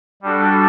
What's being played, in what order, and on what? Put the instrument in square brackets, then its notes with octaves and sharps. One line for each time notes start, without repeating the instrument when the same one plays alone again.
[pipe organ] G3 D4 F#4 A4